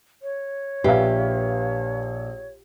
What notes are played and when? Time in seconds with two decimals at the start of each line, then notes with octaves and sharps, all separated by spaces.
0.22 C#5
0.84 A#1 G4 B4 E5 F5 C7